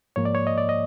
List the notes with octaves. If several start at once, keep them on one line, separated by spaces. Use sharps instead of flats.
G#2 F3 A#3 C#5
D5
C#5
D#5
D5
D#5